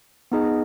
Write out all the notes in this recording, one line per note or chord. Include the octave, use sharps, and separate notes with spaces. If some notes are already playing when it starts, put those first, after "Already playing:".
B3 D#4 G#4 D#5